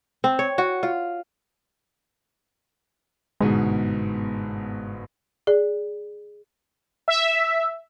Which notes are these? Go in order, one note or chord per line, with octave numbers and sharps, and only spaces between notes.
C4
C#5
F#4
F4
G1 G#2 B2 G#3
G#4 D5
E5